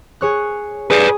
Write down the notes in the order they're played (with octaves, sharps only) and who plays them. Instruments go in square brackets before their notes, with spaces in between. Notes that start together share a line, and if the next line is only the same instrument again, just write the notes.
[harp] G#4 C#5 F#6
[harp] G#4 [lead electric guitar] B4 D5